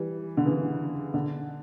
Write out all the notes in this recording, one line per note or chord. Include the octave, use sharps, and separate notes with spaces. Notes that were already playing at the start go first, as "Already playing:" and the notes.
Already playing: E3 G3
D3
C#3 E3
D3